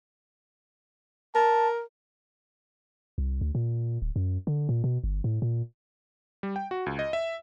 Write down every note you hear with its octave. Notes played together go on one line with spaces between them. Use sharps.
A#4 A5
C2
D2
A#2
D1
F#2
D3
A#2
B2
G1
A2
A#2
G3
G5
F#4
C#2
D#5
E5